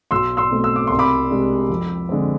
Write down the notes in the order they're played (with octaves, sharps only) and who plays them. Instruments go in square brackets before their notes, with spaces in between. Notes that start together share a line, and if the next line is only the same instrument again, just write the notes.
[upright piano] B1 C6 E6
C6 E6
B2 A3 C4
E6
D6
C2 C6
B5 D6
C3 G#3 D4
F2
D3 G#3 C4